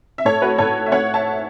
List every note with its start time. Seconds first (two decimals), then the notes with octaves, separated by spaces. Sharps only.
0.18 E5
0.25 A2 A4 C#5
0.42 F#4 B4
0.58 A2 A4 C#5
0.86 E5
0.92 A3 C#5 F#5
1.14 E5 A5